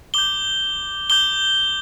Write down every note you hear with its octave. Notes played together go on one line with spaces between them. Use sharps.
D6 G6 G7
D6 G6 G7